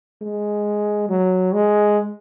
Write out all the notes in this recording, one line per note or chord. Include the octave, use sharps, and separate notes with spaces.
G#3
F#3
G#3